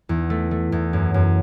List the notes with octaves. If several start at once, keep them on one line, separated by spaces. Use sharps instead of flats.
E2
A3
A3
E2
F#2
F#2